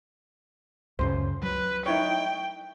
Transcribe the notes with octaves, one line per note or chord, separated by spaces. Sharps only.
C#2 F#2 C#3 C5
F#3 B4
D#4 E4 C#5 G5